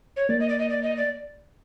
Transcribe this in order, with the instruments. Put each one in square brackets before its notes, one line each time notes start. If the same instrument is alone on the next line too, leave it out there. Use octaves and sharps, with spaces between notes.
[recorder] C#5
[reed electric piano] A#3 [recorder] D5
[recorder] D#5
D5
D#5
D5
D#5
D5